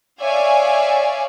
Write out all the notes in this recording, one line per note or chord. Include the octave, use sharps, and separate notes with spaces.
C#5 D5 E5 F5 G#5